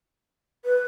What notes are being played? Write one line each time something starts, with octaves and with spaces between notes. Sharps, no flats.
B4